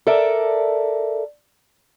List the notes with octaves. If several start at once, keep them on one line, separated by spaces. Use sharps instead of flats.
A4 A#4 D5 E5